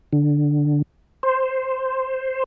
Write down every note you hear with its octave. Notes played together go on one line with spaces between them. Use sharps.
D3
C5